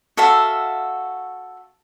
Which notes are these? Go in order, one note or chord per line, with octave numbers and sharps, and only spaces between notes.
F#4 A4 E5 F5